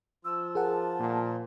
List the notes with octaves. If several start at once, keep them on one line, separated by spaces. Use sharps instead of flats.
F3 F4 E6
G#4 A#4 F#5 A5
A#2